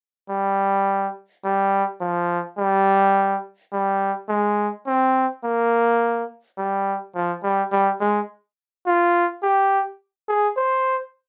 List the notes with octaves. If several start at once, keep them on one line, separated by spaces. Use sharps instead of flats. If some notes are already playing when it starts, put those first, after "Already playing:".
G3
G3
F3
G3
G3
G#3
C4
A#3
G3
F3
G3
G3
G#3
F4
G4
G#4
C5